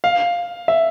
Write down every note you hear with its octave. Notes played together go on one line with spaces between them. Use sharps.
F5
E5